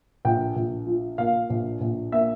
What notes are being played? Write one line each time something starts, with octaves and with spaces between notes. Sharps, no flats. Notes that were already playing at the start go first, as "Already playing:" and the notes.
A#1 G5
A#1
F3
A#2 F5
A#1
A#1
A#3 E5